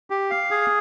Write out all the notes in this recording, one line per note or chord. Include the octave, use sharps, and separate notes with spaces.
G4
F5
G#4